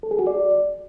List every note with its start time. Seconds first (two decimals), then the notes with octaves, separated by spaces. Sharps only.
0.03 A4
0.11 G#4
0.19 F#4
0.27 D5